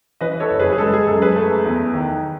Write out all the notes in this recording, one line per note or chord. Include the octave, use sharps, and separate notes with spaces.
E3 B4 D#5
A4 C#5
F#1
G#4 B4
G#4
G#3 A4
G#4
F#2 A4
G#4 B4
A3
E2
D#3